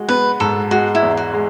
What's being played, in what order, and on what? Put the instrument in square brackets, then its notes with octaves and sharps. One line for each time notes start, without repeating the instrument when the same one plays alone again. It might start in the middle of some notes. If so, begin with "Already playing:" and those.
Already playing: [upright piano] G#3 F#4
[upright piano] B3 [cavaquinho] B4
[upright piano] G#2 [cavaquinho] A4
[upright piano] G#3 [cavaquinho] F#4
[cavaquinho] E4
[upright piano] E2
[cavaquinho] F#4
[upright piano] G#3